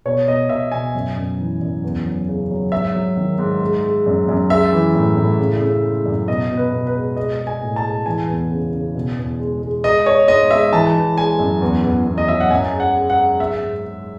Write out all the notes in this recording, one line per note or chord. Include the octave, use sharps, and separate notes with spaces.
B2 C#5
B2 D#5
B2 E5
B2 G#5
F#2
F#2
E3
F#2
E2
F#3
C#3
F#3
G#2 E5
F#3
D#3
G#2
G#3
G#3
F#2
F#2
G#3 E5
E3
A2
A2
C#3
C#3
G#3
F#2
B2 D#5
B2
B4
B2
B4
G#3
G#3 D#5
G#3
G#5
A2
A5
G#3
E3 G#5
E2
C#3
C#3
B2
E2
G#3
G#3
G#3 D#5
G#3 C#5
G#2 D#5
G#3 E5
E3 A5
E3
G#3 G#5
F#2
E2
E2
E2
D#5
F#3 E5
F#5
F#2 G#5
G#3
F#5
G#3
F#5
G#3
G#2 E5
G#2
G#2